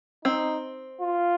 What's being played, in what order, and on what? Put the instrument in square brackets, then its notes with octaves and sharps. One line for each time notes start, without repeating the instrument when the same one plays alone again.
[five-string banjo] C4 [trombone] D#4
[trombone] F4